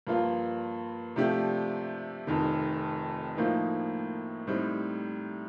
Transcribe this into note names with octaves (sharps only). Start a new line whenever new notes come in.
G2 F3 A#3 F4
C3 F3 A3 D4 G4
F1 F2 D#3
A2 F3 A#3 D#4
A2 G3 C4 D#4